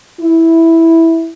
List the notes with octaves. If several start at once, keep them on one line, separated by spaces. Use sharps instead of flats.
E4